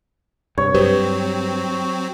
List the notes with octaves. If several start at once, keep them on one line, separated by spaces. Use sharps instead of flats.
G2 C3 C#5
G2 F#3 C4 G4 B4 C5